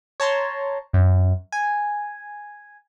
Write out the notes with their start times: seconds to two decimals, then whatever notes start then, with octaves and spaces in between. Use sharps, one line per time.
0.20 C#5 A5 A#5 C6
0.93 F#2
1.52 G#5